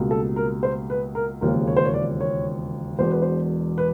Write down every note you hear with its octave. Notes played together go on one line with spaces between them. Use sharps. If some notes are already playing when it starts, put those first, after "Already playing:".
Already playing: C#2 B2 G3 A#3
A4
A#4
C5
B4
A#4
E1 D#2 C#3 F3 A#4
C#5
C5
C#5
D5
C#5
E1 E2 B2 C5
B4
C5
B4